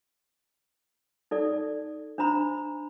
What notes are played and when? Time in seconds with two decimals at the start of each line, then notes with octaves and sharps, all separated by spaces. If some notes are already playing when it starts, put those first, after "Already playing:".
1.31 D#4 A4 D5
2.18 D4 C5 A#5 B5